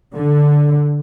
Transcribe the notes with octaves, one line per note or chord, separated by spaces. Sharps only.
D3